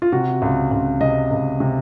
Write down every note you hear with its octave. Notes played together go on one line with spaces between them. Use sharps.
F4
C3 F#4
C#2
C#2
C3 D#5
C#2
C3